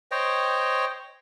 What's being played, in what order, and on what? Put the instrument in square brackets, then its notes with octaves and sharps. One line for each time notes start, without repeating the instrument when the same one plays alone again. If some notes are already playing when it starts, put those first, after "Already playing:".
[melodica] C5 C#5 D#5 G5